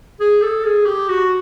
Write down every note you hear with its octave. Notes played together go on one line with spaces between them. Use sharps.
G#4
A4
G#4
G4
F#4